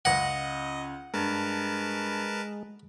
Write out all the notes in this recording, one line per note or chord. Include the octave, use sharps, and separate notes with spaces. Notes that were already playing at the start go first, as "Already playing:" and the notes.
C#2 D#5 F#5 A#6
G2 G#3 A#4 B4 A5